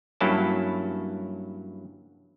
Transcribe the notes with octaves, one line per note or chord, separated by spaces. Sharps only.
G2 F#3 A#3 C#4 E4 A5